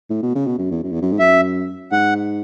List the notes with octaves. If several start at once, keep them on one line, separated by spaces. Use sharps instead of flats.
A2
B2
C#3
B2
F#2
E2
F#2
E2
F#2
G#2
F#2 E5
G#2 F#5